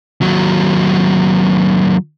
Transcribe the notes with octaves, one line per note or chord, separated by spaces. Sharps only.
D#2 F#3